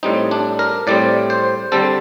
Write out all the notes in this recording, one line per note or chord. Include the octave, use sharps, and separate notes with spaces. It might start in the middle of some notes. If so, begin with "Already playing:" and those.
A2 G3 C4 D#4
D4
A#4
A2 G3 C4 D5
C5
D3 G3 C4 A4